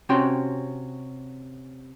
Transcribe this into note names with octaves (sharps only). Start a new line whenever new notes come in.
C3 C#4 F#4 C#5 G5 C6